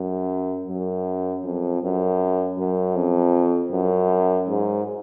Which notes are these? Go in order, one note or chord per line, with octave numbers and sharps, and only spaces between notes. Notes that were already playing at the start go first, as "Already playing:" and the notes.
Already playing: F#2
F#2
F2
F#2
F#2
F2
F#2
G#2